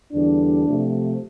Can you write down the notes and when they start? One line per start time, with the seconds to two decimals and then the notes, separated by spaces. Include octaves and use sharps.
0.13 E2 D3 G3 D4
0.66 C3 F3 A3